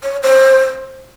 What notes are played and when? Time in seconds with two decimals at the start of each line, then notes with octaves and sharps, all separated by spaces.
0.03 C#5
0.23 C5